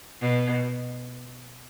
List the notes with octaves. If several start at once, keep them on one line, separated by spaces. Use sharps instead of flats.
B2